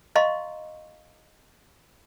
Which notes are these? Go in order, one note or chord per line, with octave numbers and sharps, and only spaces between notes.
D#5 F5 A#5 C6 C#6